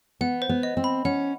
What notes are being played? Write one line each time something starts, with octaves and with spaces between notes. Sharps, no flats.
B3 F#5
C5
B3
D#5
C4
B5
C#4 F#5